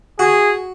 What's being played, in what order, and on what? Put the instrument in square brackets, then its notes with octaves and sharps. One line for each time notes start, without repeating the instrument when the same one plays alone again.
[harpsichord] F#4 [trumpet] G#4